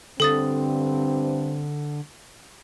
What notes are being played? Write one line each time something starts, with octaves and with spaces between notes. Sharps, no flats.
G2 D3 C4 A4 D#6 A6